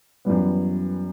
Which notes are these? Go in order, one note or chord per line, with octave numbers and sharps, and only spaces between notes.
F#2 E3 G3 B3